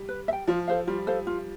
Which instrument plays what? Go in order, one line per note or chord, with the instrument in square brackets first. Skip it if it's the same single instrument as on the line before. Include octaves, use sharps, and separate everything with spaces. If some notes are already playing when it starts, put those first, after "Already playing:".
Already playing: [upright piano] G3
[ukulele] B4
E5
G5
[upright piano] F3 [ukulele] F4
[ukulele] A4 C5 F5
[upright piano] G3 [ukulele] F4
[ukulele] A4 C5 F5
F4